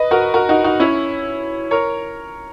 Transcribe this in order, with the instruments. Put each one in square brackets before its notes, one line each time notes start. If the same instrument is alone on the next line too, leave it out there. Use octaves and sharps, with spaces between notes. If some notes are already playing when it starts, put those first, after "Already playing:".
Already playing: [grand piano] B4 D#5
F#4 A#4
F#4 A#4
D#4 F#4
D#4 F#4
C#4 E4
A#4 C#5